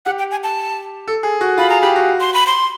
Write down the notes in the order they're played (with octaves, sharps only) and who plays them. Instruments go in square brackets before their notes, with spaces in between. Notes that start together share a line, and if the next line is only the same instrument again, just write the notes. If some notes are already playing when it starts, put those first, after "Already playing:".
[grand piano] G4 [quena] F#5
[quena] G5
G#5
A5
[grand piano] A4
G#4
F#4
[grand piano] F4 [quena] B5
[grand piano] G#4 [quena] A#5
[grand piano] G4 [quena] B5
[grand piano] F#4
[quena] C6
B5
C6